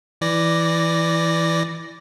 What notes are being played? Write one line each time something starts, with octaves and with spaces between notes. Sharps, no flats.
E3 D5 A#6